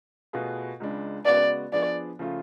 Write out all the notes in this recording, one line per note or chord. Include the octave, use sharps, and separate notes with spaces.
B2 A3 F4 G#4 B4
C#2 C#3 G#3 D4
C#3 G#3 B3 F#4 D5
F3 B3 D4 G#4 D5
C#3 F3 A3 F4